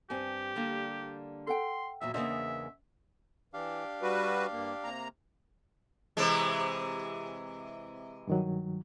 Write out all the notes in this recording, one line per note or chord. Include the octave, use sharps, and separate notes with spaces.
G2 C4 G4 G#5
D3 G3 A#3
A4 F#5 G5 C6
E2 A#2 F#3 E5
E2 C#3 A#3 D4 C5 D#5 E5
E3 D4 G4 F5
G3 F#4 B4
G2 A#3
C3 A#3 A#5
C3 E3 G#3
G2 D#3 F#3